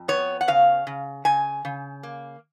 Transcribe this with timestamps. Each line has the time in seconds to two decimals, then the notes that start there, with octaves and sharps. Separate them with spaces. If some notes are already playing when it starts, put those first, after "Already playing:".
Already playing: F2
0.08 B3 C#5
0.41 F#5
0.48 C#3 F5
0.87 C#3
1.25 C#3 G#5
1.65 C#3
2.03 A#3